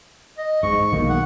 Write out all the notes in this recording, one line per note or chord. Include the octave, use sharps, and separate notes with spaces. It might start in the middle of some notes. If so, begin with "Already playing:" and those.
D#5
G#2 C#6
B1 D#3 A#3
F#5